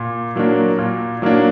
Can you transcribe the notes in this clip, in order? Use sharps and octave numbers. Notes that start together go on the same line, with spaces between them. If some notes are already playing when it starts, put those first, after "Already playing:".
Already playing: A#2
F#3 A#3 D4
A#2
F#3 A#3 D4